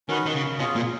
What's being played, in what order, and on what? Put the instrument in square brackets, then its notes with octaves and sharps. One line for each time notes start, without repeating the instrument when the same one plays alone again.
[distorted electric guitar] D#3 [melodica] C#4 F#4 B4
[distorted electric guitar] D#3
C#3
[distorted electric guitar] B2 [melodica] C#4 F4 G#4
[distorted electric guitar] A#2